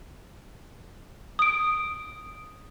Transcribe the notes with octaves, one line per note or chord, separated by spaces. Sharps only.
D#6 D7